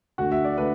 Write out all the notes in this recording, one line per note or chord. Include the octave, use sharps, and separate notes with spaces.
D2 D3 A3 F#4
E5
D5
D3 A3 B4